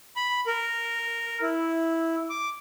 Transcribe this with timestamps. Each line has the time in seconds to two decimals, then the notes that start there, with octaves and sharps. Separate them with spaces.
0.16 B5
0.47 A#4
1.42 E4
2.30 D6